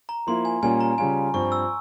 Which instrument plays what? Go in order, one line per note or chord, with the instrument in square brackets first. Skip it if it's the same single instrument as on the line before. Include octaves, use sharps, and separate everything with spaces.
[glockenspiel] A#5
[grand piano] F3 A#3 E4 [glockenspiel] C6
[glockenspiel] G#5
[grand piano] A#2 G3 A#3 C#4 [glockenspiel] G#5
[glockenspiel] A#5
[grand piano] C#3 G3 C#4 F4 [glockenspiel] G#5
[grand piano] G2 F3 C4 [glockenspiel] C#6
[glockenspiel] E6